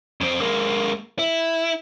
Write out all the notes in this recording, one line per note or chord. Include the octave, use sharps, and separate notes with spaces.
F2 C4
G#3 A#3
E4